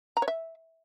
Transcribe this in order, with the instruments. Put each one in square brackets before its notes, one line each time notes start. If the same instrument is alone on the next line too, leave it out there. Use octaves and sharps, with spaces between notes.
[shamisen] A#5
C#5
E5